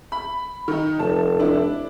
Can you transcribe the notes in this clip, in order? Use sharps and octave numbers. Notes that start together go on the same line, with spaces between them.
B5
D#3 D#4
F1 A5
D4 E4